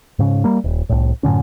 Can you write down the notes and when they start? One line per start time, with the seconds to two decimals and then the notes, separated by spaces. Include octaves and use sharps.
0.19 G#2 C#3
0.44 G3 A#3
0.64 D#1
0.89 C2 A2
1.23 F#2 A2 D3 C#4